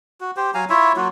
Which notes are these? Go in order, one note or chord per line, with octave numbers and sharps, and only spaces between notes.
F#4
G4 C5
F#3 F5 G#5 A#5
E4 F4 C#5 E5
F#3 A#3 F4 F#4